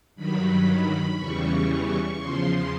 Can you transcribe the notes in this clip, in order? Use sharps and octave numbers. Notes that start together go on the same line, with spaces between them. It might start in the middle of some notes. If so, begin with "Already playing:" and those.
G2 D#3 F#3 B5
E2 C#3 E3 G3 C#6
E2 C#3 F3 C6